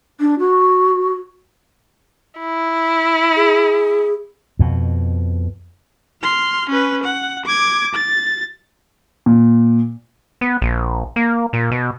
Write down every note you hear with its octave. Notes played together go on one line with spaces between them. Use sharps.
D4
F#4
E4
G#4
F2 B2
C6 F6
C#4 B4
F#5
D6 G#6
A6
A#2
B3
A#1
A#3
A#2
B2